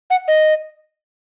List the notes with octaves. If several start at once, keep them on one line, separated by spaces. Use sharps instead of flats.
F#5
D#5